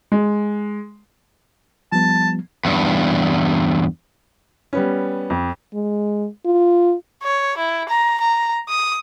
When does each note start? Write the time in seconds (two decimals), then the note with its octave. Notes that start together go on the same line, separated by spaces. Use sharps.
0.12 G#3
1.92 F3 G3 B3 A5
2.65 E2 G2
4.73 G3 B3 C#4
5.30 F2
5.74 G#3
6.45 F4
7.23 C#5
7.57 E4
7.89 A#5
8.21 A#5
8.69 D#6